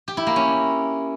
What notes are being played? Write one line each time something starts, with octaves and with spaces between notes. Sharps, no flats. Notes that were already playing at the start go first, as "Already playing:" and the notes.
G4
E4
A#3
C#4